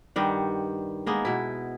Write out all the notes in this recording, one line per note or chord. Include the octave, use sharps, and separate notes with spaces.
G2 D#3 G3 F#5
G#3 A#3 B3
B2 E4